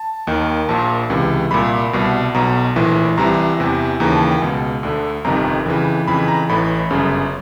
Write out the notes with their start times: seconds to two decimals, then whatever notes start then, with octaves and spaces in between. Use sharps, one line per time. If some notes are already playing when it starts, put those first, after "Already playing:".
Already playing: A5
0.27 D#2 D#3
0.68 A#1 A#2 A5
1.10 C#2 C3 E3
1.51 C2 A#2 B5
1.93 C2 B2
2.35 B1 B2 A#5
2.76 A#1 A2 E3
3.17 C2 C3 E3 A#5
3.59 E2 C3 E3
4.00 D#2 C#3 E3 A#5
4.11 A5
4.21 G#5
4.31 G5
4.42 C#2 B2
4.83 D2 D3
5.24 G1 F2 C3 D#3 A#5
5.66 F2 C#3 E3
6.08 F2 C#3 E3 B5
6.28 A#5
6.49 A1 A2 E3 B5
6.90 G1 F#2 C#3